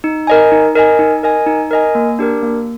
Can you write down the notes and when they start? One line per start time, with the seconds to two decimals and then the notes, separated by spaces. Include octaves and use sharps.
0.04 D#4
0.27 A#4 D#5 G#5
0.52 D#4
0.75 A#4 D#5 G#5
0.99 D#4
1.23 A#4 D#5 G#5
1.47 D#4
1.71 A#4 D#5 G#5
1.95 A#3
2.19 D4 G4 A#4
2.43 A#3